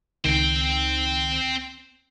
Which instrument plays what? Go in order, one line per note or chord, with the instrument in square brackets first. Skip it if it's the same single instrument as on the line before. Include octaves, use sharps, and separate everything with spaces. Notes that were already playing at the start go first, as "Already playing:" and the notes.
[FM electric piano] C#2 D#3 [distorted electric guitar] C4 G5